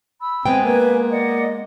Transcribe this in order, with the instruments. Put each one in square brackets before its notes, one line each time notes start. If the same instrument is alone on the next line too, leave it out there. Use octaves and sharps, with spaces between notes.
[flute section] B5 E6
[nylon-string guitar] G#3 B3 G5 [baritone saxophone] C4 [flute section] G#5
[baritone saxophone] A#3 [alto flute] B4
[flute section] D5 F#5 D#6 [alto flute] D#5